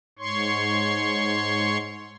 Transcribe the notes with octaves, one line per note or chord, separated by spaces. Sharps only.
G#2 C#5 C6 C#6